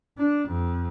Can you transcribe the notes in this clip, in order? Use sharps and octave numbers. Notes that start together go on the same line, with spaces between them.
D4
F2